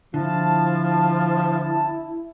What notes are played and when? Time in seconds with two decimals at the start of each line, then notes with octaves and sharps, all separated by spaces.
0.14 D3 F3 E4 A5